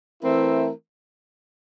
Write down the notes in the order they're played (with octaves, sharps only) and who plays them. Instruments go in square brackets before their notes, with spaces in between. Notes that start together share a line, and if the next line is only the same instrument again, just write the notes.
[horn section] E3 A3 C4 E4 A#4